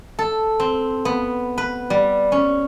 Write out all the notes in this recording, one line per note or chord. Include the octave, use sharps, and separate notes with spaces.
A4
C4
B3
B4
G3
C#4